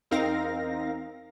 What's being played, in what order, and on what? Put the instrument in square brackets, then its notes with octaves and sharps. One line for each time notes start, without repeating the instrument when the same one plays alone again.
[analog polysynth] E2 C4 D#4 A#4 F5 A#6